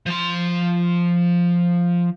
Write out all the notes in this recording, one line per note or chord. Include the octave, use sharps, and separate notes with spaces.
F3 C6